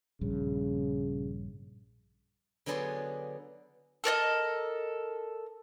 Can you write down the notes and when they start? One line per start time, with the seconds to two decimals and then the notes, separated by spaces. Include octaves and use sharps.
0.21 A#1 G2 C#3
2.66 D3 F#3 B3 G#4 D5 C6
4.04 A4 A#4 D5 D#5